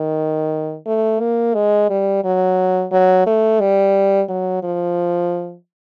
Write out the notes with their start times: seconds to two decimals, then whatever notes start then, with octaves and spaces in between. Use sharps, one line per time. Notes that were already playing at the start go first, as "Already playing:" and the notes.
Already playing: D#3
0.86 A3
1.20 A#3
1.55 G#3
1.90 G3
2.24 F#3
2.92 F#3
3.26 A3
3.60 G3
4.29 F#3
4.63 F3